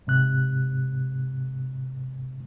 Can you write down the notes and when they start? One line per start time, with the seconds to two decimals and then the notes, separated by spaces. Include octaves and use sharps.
0.07 G#2 C3 F#6